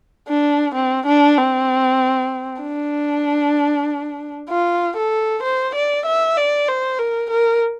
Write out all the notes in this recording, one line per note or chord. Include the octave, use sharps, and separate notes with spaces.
D4
C4
D4
C4
D4
F4
A4
C5
D5
E5
D5
C5
A#4
A#4